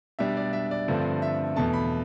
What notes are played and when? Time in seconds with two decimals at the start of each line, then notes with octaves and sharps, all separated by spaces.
0.19 B2 G3 D4 E5
0.37 D5
0.53 E5
0.71 D5
0.88 G2 D3 F3 A3 C4
1.22 E5
1.56 E2 B2 A3 A5
1.73 B5